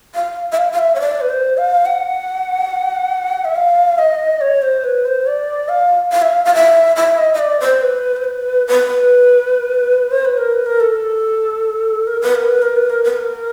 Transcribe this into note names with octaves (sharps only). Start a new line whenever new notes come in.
F5
E5
F5
F5
E5
C#5
D5
B4
C5
F5
F#5
E5
F5
D#5
C#5
C5
B4
C5
D5
F5
F5
E5
F5
F5
E5
E5
D#5
D#5
D5
C5
B4
C5
B4
B4
C5
B4
A#4
B4
A#4
A4
A#4
B4
A#4
B4
A#4
B4
A#4
B4
A#4